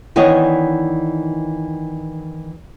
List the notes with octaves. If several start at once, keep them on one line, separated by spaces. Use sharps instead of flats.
D#3 E3 B3 D4 C#5 D#5